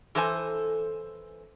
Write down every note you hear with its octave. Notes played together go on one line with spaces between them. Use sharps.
E3 A4 C5 G#5